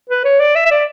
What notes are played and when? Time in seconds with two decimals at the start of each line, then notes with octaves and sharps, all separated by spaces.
0.09 B4
0.24 C#5
0.39 D5
0.55 E5
0.66 E5
0.71 D5